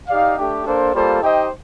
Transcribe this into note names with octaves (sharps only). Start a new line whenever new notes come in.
D#4 G4 D5 F5
A3 D4 G4
A#3 D4 A4 C5
G3 A#3 F4 A4 C5
D#4 G4 C5 D#5 G5